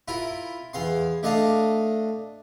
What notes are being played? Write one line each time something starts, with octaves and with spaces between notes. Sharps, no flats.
E4 F4 A#4
E2 F5 C6
A3 D4 D#5 F5